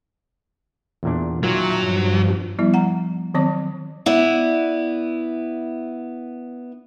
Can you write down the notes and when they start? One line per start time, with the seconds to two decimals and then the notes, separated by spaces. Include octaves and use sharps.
1.03 E2 A#2 D4
1.43 A#2 D#3 F#3 A#3 E5 G5 A5
1.78 G2 F3
2.59 F3 G3 B3 E4
2.74 F#5 A#5
3.34 D#3 F#3 C4 C#5 D6
4.06 B3 E4 D5